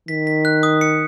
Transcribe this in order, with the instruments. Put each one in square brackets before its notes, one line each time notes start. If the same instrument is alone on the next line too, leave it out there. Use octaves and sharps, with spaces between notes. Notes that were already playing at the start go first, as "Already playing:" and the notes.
[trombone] D#3 [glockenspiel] B6
[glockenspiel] B6
F#6
D#6
C#7